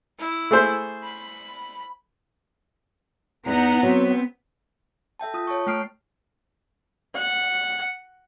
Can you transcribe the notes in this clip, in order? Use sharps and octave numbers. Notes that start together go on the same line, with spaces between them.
E4
A3 G#4 C5
B5
E2 B3 D#4 F#5 A#5
F#3 C4
A4 E5 G5 A5
F4 D#6
C#5 A5 C#6
A3 G5 F6 C7 D7
F#5